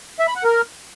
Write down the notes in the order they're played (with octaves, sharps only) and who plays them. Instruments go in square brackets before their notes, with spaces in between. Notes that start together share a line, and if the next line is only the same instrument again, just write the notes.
[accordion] E5
B5
F#5
A#4